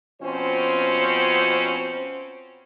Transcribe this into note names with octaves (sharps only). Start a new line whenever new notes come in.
B2 F3 C4 C#4 C5